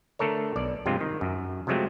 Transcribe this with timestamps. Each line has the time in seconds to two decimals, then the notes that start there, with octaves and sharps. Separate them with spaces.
0.19 D3 A3 A4 A#4 C#5
0.56 B1 D5
0.86 G2 C3 F3 G#3 C4 F4
1.01 D#3
1.21 F#2
1.67 C3 F3 F#3 G#3 A3 C4